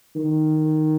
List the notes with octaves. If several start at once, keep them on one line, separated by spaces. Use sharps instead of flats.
D#3